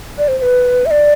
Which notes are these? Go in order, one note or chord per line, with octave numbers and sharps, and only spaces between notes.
D5
C5
C5
B4
E5
D5